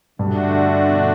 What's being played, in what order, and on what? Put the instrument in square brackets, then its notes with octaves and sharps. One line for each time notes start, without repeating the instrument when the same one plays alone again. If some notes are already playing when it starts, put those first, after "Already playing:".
[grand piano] G2 [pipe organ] D3 A3 D4 F#4
[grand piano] B2